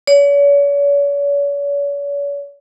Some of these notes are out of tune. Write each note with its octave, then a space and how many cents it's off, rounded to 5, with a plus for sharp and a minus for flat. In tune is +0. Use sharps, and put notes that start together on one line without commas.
C#5 +40